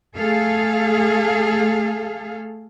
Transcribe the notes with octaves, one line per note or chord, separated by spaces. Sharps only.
A3 G#4 A4 F5